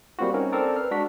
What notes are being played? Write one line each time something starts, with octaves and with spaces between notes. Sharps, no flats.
G3 A#3 C4 F4 F#4
C4 C#4 D#4 A#4
C4 A4 A#4 D5
B4 F6
G#3 D4 F#4 B6